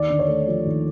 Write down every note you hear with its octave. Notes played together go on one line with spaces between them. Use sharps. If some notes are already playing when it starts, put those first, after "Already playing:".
Already playing: D#2 D5
D3
C#5
A3
F3
D#2